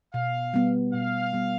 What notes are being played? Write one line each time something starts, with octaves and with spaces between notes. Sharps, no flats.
B2 F5
G3 B3
B2 F5
G3 B3